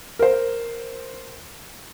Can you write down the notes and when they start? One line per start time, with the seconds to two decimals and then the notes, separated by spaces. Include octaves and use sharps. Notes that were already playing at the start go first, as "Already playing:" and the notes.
0.19 A#4 C5